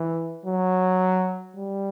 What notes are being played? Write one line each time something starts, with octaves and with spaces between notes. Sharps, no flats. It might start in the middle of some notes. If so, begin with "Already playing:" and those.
Already playing: E3
F#3
G3